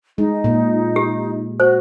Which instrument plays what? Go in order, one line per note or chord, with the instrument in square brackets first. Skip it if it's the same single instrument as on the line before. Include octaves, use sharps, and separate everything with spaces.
[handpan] G#3 [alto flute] D#4
[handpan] A#2
[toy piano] G4
[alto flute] F#4 [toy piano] C5